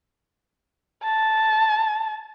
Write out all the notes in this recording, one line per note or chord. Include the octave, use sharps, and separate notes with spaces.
A5